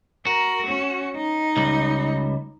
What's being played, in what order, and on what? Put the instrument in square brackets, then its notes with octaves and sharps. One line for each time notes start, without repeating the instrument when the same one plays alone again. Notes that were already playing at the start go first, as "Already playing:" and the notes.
[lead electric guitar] F#4 [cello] A#4
[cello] C#4
D#4
[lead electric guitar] C#2 G3